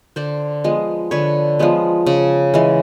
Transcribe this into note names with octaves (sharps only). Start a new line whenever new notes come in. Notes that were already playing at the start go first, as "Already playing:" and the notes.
D3 C5 D5
F3 G#3 B3
D3 B4 C#5
F3 G#3 B3
C#3
E3 G#3